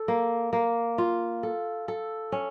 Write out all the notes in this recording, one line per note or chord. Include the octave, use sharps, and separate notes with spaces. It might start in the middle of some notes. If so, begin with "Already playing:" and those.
Already playing: A4
A#3
A#3
F4
A4
A4
C#4